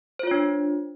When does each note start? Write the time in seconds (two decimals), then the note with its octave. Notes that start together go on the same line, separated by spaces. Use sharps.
0.19 C5
0.23 F4
0.27 C#5
0.31 D4